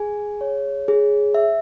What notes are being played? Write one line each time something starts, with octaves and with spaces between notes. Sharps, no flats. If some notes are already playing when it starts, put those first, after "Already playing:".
Already playing: G#4 G#5
C#5
G#4
E5